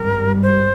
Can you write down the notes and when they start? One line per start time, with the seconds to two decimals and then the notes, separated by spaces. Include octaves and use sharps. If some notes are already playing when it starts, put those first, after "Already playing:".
Already playing: G#1 G2 G3 A#4
0.42 C5